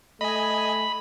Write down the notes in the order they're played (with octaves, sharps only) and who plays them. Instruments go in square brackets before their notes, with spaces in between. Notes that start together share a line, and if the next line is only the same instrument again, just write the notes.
[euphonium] A3 [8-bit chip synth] D#5 G#5 [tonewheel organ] B5